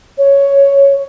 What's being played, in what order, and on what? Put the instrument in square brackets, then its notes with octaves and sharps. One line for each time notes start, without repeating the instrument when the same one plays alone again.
[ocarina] C#5